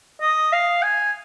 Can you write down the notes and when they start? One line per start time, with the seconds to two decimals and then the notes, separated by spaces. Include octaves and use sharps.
0.21 D#5
0.52 F5
0.83 G#5